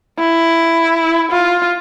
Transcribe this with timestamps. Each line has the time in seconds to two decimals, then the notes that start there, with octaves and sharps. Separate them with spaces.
0.19 E4
1.32 F4